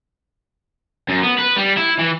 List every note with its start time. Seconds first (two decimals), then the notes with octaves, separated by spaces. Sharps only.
1.09 F#2
1.23 B3
1.39 B4
1.57 G3
1.78 E4
1.99 E3